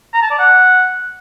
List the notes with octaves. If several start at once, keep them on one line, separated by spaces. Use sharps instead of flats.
A#5
A5
D5
F#5